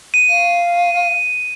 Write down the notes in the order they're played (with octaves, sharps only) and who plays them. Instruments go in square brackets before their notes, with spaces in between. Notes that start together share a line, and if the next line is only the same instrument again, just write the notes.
[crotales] D#7
[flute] F5